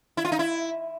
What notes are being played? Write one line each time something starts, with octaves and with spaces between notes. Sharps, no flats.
E4
F4
D#4
E4